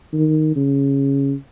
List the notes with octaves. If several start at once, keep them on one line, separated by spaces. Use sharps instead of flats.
D#3
C#3